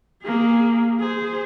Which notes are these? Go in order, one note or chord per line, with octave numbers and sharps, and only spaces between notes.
A#3 G#4
G#4 C5